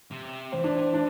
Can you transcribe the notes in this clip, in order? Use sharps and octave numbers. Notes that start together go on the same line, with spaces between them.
C3
E3 C4
D4
C4
D4